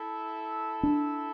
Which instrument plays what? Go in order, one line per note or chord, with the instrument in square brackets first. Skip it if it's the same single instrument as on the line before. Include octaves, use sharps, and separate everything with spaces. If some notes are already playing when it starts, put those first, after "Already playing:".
Already playing: [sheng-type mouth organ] E4 A4 E5
[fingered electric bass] D4